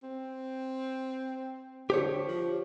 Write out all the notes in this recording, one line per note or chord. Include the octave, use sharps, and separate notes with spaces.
C4
D3 G4 C5 C#5
F3